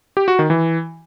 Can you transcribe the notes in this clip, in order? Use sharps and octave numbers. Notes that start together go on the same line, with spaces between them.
G4
F#4
D#3
E3